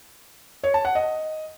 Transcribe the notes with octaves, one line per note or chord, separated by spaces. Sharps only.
C#5
A5
F#5
D#5